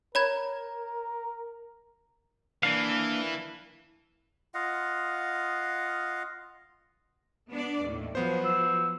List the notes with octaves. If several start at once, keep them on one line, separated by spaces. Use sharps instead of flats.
A#4 C#5 B5 G#6
E3 A#3 D4 F5
F4 D#5 F5 F#5
B3 D4 D5
D#2 A2
F3 F#3 B3 C5
E6